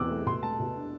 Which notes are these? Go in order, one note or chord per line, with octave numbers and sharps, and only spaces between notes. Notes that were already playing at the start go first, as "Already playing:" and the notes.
Already playing: E2 B2 C4 D6 E6 F#6
A3
B2 C6
A3 A5
B2
D4